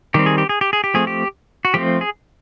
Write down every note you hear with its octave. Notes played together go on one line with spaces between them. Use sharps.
D#3 G3 C4 G4
G#4
G4
G#4
G4
G#4
G4
F3 A3 C4 G#4
G4
F#4
F3 A3 C4 G4
G#4